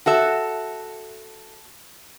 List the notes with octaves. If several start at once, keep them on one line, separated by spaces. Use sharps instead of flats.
F#4 A4 E5